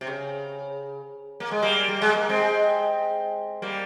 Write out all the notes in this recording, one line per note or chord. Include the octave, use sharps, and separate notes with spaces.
C3
C#3
A#3
G#3
G3 A#3
G3
G#3
A#3
G#3 C4
G3 A#3